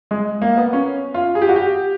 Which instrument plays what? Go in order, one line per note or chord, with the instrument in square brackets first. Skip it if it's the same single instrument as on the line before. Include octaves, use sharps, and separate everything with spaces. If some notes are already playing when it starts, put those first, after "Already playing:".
[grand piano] G#3
A#3
B3
C#4
F4
G#4
G4
F#4
G4